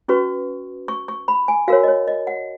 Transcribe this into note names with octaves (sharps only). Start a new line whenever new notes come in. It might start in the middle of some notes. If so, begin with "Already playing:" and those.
C#4 F#4 B4 C#6
C#6
C#6
B5
G#5
F#4 A#4 C#5 F5
D#5
C#5
D#5
F#5